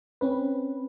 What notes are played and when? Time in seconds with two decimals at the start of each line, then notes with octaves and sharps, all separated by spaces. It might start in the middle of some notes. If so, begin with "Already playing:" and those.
0.21 C4 C#4 B4